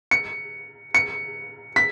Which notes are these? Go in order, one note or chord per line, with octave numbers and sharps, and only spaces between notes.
C#7
C#7
B6